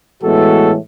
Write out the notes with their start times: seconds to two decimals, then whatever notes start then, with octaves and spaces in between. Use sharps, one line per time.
0.21 A2 E3 G#3 B3 F#4 A4